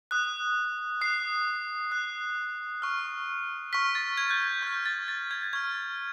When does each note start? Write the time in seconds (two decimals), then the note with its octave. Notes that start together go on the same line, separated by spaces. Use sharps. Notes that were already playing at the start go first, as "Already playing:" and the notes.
0.11 D#6 F#6
1.01 D#6 F#6 C7
1.91 D#6 F#6
2.82 C#6 F6
3.73 C#6 F6 B6
3.95 A6
4.17 G#6
4.30 G6
4.41 G#6
4.62 C#6 G6
4.67 F6
4.86 A6
5.08 A6
5.31 G#6
5.53 C#6 F6 G#6